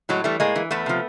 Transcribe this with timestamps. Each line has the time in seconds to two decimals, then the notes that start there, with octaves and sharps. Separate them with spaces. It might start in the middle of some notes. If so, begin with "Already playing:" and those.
0.09 A2 F#3 G#3
0.24 E3 G3 A3
0.40 A2 G#3 A#3
0.56 E3
0.71 E2 A3 B3
0.86 C3 F3